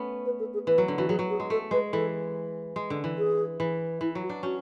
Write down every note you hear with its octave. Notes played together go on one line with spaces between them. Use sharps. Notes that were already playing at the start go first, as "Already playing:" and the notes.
Already playing: A3 B3 C#4
B4
A4
G#4
E3 B4
F#3
D3
E3 F#4
F#3 G#4
F#3
G#4
G#3
A3 A4
G#3 B4
E3 A4
G#3
D3
E3
G#4
E3
E3 E4
F#3
F#4
D4
C#4 F#4